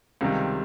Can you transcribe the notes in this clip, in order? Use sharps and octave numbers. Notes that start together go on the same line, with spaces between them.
C#2 C3 D#3 G3